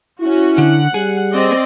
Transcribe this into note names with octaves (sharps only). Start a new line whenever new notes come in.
C#4 E4 F#4
D3 F#5
G3 G#4
C4 D5 D#5